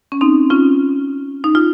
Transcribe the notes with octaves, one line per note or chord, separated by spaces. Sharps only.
C#4
C4 D#4
C#4 F4
D#4
F4